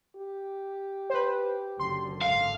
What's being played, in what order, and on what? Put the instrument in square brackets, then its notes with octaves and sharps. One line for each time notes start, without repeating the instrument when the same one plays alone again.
[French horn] G4
[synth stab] B4 C5
[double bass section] F#1 D3 [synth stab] C6
[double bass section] G#1 D3 [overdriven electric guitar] F5